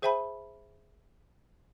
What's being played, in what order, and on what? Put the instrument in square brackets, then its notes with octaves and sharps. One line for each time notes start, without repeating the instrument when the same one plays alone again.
[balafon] G#4 C5 E5 G5 A5 B5